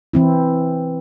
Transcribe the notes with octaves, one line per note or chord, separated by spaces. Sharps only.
E3 C4 E4